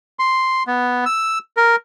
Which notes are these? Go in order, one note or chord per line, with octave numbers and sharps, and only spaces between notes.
C6
B3
E6
A#4